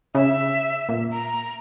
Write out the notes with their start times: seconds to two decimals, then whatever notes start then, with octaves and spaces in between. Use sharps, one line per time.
0.15 C#3 E5
0.89 A#2
1.12 A#5